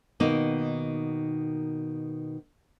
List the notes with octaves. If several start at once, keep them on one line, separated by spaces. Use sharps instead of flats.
B2 D#3 A#3 D#4